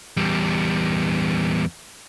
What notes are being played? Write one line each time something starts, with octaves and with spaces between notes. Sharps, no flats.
E2 G3